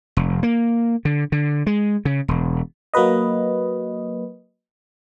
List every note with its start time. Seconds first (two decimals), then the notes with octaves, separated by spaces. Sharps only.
0.17 F1
0.43 A#3
1.05 D3
1.32 D3
1.67 G#3
2.05 C#3
2.28 E1
2.94 F#3 A#3 F#4 B4 D#5